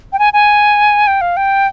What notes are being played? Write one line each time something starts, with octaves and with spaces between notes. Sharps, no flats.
G5
G#5
G#5
G5
F5
G5